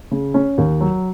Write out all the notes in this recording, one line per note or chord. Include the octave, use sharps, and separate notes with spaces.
C#3
C#4
D#2
F#3